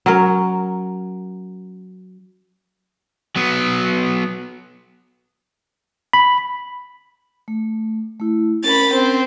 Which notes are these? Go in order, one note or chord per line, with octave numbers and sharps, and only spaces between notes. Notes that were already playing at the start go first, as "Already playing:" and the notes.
F#3 C#4 A#4
F#3 B3
B5
A3
A3 E4
C#4 A#4 B5 A6
C4